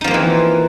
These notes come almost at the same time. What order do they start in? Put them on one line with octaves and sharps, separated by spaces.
D#4 F3 A#3 C4 E3